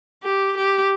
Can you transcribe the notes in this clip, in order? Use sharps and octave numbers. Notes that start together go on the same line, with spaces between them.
G4
G4